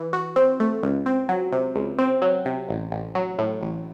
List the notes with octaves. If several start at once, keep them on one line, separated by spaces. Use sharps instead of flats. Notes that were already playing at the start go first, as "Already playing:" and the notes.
Already playing: E3
F#4
C4
A3
C#2
C4
F#3
C3
C#2
C4
F#3
C3
A1
A1
F#3
A2
A1